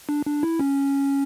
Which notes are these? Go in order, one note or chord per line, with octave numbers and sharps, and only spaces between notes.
D4
D4
E4
C#4